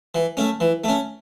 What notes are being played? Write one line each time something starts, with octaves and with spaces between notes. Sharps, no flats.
E3
A3 C#4
E3
A3 C#4